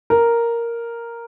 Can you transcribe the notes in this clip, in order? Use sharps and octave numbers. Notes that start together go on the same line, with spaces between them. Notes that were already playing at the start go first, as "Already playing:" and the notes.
A#4